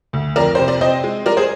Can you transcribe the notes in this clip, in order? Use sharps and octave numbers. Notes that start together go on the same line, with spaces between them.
D2
F2 A#4 D5
C3 C5
D5
C4 C5 D#5
G#3
G3 A#4 D5
G#4 C5